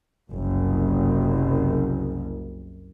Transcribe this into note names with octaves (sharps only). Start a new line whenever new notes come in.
F#1 C2